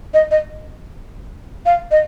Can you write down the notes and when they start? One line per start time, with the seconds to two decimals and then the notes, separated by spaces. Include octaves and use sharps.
0.14 D#5
0.31 D#5
1.66 F5
1.91 D#5